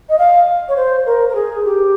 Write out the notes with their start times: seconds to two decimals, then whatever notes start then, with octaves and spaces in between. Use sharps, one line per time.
0.09 D#5
0.19 F5
0.68 C#5
0.76 C5
1.06 A#4
1.29 A#4
1.35 G#4
1.65 G4